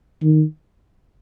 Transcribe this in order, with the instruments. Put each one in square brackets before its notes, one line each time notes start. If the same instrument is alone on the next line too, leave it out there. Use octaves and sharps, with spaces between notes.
[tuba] D#3